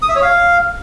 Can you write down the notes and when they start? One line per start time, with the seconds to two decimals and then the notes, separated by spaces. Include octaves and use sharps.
0.02 D#6
0.09 E5
0.15 C#5
0.22 F5